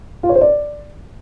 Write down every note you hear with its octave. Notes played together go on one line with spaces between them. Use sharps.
F4
C#5
C5
D5